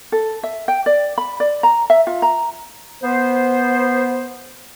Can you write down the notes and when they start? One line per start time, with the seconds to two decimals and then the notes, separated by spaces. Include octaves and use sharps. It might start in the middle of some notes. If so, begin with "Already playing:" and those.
0.12 A4
0.43 E5
0.68 G5
0.86 D5
1.18 B5
1.40 D5
1.63 A#5
1.90 E5
2.07 F4
2.22 A#5
3.02 B3 C5